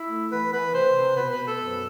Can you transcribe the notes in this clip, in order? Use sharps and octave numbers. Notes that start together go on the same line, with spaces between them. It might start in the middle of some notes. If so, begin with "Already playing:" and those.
Already playing: E4
A3
E3 B4
E3 B4
C3 C5
C3
B2 B4
B4
B2
A4
F#2